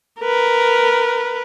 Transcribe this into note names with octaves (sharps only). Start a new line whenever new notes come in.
A#4 B4